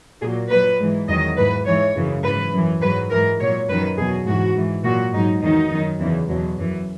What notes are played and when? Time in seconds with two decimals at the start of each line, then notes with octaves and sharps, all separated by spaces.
0.21 A#2 G#4
0.26 F#3
0.50 A#2 F#3 B4
0.80 G#2 E3
1.08 E2 D#3 F#3 D#5
1.37 G#2 E3 B4
1.66 G#2 E3 C#5
1.95 F#2 C#3 E3
2.24 G#2 E3 B4
2.53 F#2 E3
2.81 G#2 F#3 B4
3.11 G#2 E3 A#4
3.40 A#2 F#3 C#5
3.69 F#2 D#3 F#3 B4
3.97 E2 B2 F#3 G#4
4.26 G#2 E3 F#4
4.55 G#2 E3
4.84 A#2 F#3 F#4
5.13 G#2 F#3 D#4
5.42 E2 D#3 F#3 D#4
5.71 F#2 D#3 F#3
5.99 E2 C#3 E3
6.28 E2 B2 F#3
6.57 F#2 E3